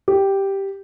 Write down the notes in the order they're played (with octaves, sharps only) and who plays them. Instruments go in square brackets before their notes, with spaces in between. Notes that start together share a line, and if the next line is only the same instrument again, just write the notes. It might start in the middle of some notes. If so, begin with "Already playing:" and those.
[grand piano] G4